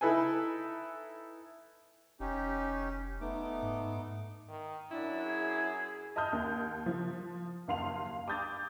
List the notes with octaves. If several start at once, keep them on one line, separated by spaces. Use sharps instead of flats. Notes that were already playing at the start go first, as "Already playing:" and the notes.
D#4 E4 A4 B4 G#5
F1 C#4 D#4 G4
A3 B3 D#4 D6
G#2
D#3
F#2 D4 E4
G#4
D#5 A5 D#6 F6 G6
D#2
F3
F#1 D#2 F5 C6 F7
D6 D#6 G6 A6